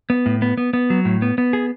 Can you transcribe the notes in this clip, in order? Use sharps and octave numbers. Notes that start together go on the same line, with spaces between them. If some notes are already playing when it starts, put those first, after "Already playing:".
B3
A2
B3
B3
B3
F#3
A2
B3
B3
G#4